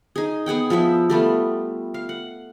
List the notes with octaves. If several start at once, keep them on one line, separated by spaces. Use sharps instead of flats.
D#4 G#4
B3 G#4 F#5 G5
F3 B3 E4 E5
G3 A3 B3 F4
F5
F#5